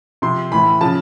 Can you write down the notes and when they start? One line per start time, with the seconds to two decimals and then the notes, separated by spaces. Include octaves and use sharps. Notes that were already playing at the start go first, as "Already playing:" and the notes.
0.22 C3 F3 C6
0.52 A2 E3 B5
0.81 C#3 F3 A5